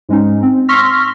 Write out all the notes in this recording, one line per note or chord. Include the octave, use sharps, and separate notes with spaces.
G#2 G#3 C#4 D#4
C4
C6 C#6 E6 F6 A#6 B6